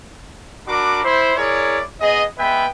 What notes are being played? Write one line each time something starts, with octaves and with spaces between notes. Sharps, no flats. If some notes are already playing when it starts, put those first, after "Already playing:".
D4 F#4 A#4 B5 D6
E4 C5
E4 G#4 A#4 C#5 D5
B3 G#4 D#5
G#3 B3 B4 E5 G5